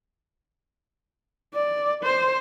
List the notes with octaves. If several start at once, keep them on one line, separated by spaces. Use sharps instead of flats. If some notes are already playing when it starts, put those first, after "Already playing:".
D5
C5